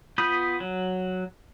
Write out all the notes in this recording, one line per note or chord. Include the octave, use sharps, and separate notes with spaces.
B3 F4 B5 D#6 G6
F#3